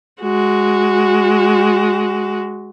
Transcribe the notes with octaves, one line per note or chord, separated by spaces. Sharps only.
G#3 F#4